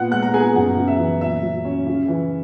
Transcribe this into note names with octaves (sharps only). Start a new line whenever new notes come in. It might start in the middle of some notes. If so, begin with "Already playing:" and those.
Already playing: A#2 B3 F#5 F#6
G#3 F#5 F#6
A#5
B3 G#4 G#5
F#2 F#5
C#3
E5
E3
A#2 E5
F#3
C#4
C#3
E3